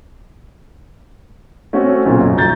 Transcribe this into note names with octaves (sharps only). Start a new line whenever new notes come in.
A3 C4 C#4 F#4
B1 A#2 C#3
F#2
D#1 A#5 G6 A6